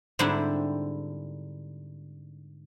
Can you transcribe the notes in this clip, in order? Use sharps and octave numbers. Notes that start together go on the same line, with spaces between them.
G#2 D3 G3 C4 D4 E4